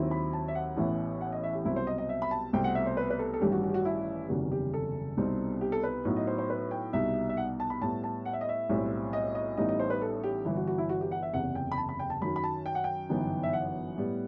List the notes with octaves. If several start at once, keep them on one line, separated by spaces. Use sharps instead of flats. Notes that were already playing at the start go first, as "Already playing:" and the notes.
Already playing: D#2 D#3 F#3 C4 E4
B5
A5
E5
F#5
A1 A2 E3 B3 E4
F#5
D#5
E5
G4
C2 B2 F#3 C4 E4
C5
D#5
D#5
E5
B5
A5
C2 B2 A3 C4 G5
F#5
E5
C5
B4
B4
A4
A4
A1 G2 D#3 G3 G4
F#4
F#4
G4
F#4
E4
F#1 E2 C3 D#3 G3 F#4
G4
A4
C2 B2 G3 C4 D#4
G4
A4
B4
A2 F#3 B3 D#4
D#5
C5
C5
B4
G5
C2 B2 G3 D#4 E5
E5
F#5
A5
B5
A2 G3 B3 A5
A5
F#5
E5
D#5
E5
B1 A2 G3 C4 E4
D#5
D#5
A1 A2 G3 B3 D#4 D#5
D#5
C5
B4
A4
G4
G1 G2 E3 E4
F#4
F#4
E4
F#4
G4
F#5
E5
F#1 E2 C3 F#5
G5
B5
A5
B5
G5
A5
F#2 D#3 F#3 B5
B5
A5
G5
F#5
G5
G1 F#2 E3 B3 D#4
E5
F#5
A2 G3 B3